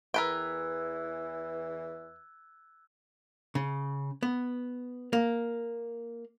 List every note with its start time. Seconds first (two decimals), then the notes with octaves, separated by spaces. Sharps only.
0.14 E2 E3 A#4 B4 G5 E6 F#6 G#6
3.55 C#3
4.23 B3
5.13 A#3